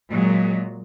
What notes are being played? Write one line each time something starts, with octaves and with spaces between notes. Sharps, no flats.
A#2 F#3 G#3